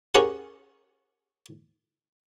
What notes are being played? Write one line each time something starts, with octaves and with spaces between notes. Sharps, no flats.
C#4 G4 G#4 A#4 C#5 F#5